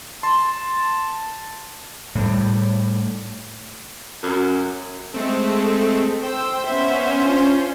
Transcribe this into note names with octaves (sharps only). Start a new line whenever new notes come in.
A5 C6
A2 G3
F#2
G#3 A3 C4 A4
C5 G5 E6
B3 C#4 C5 E5
D4 F4